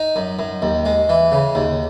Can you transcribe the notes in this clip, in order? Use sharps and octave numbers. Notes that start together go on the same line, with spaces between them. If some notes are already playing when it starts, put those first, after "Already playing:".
Already playing: D#4
F#2
F#2
D#2
G#3
E3
C#3
D#2